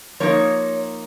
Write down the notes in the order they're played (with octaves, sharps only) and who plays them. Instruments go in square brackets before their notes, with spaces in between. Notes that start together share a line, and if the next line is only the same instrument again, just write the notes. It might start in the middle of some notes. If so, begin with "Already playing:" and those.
[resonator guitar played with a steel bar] F3 A#3 D#4 C#5